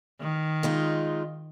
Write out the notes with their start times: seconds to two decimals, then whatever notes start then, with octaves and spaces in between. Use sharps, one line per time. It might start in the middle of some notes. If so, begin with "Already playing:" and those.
0.21 D#3
0.63 G#3 D#4 F4